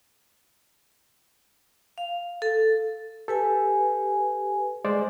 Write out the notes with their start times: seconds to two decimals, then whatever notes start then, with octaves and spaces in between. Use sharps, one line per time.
1.98 F5
2.42 A4
3.28 G4 A4 B4 G#5
4.85 G#3 C5 D5